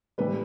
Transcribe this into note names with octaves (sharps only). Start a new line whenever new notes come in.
A2 E3 G3 B4